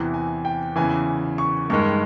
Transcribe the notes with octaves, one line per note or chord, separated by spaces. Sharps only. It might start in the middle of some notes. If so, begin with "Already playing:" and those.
Already playing: E2 C3 E3
G#5
G5
E2 C#3 E3 G#5
C#6
G2 D#3 G#3 C#6